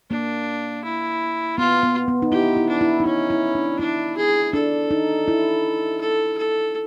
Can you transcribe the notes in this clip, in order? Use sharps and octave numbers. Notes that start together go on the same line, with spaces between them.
A#3 D4
E4
B3 F4
B3
B3
D#4
E4 G4
E4
D4
E4
D#4
C#4 E4
E4
D4
D4 E4
G#4
D4 A4
D#4
E4
A4
A4